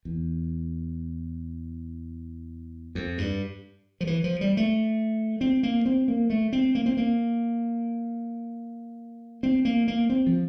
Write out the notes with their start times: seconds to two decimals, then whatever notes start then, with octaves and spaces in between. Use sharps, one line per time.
0.05 E2
2.95 F2
3.18 G2
4.01 F3
4.07 E3
4.24 F3
4.41 G3
4.57 A3
5.41 C4
5.63 A#3
5.85 C4
6.08 A#3
6.30 A3
6.53 C4
6.75 A#3
6.86 C4
6.97 A#3
9.43 C4
9.65 A#3
9.88 A#3
10.10 C4
10.27 F3